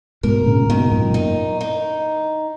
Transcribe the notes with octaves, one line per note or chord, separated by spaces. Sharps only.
G#2 B2 A#4
A#2 C#3
G#2 B2 D#3
F#2 A#2
D#4
D#4